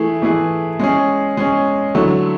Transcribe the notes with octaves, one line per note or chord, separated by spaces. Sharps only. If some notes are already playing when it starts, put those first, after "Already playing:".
Already playing: E3 A3 E4 G#4
E3 A3 E4 G#4
G#3 C#4 G#4
G#3 C#4 G#4
D3 F#3 A3 E4